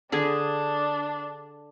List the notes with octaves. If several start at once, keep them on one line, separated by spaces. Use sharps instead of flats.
D3 D4 G#4